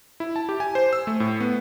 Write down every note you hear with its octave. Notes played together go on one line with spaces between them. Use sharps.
E4
A5
G4
G#5
C5
E6
A3
A2
B3